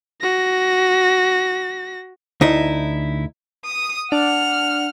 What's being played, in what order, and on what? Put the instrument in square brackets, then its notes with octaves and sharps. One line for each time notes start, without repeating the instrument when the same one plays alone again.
[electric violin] F#4 A#6
[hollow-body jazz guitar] D2 D#4 E4
[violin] D#6
[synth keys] D4 [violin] F#5 F6